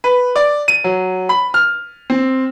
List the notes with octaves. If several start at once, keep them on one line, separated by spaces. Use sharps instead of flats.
B4
D5
D#7
F#3
B5
F6
C4